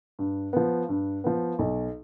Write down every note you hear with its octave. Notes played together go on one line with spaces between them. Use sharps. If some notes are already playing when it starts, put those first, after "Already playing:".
G2
F3 B3
G2
F3 B3
B1